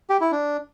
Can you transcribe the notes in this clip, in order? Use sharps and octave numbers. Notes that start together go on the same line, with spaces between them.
G4
E4
D4